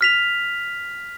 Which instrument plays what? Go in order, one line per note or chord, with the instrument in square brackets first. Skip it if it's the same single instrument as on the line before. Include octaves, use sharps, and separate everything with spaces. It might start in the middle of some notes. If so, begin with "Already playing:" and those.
[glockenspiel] F6 B6 F7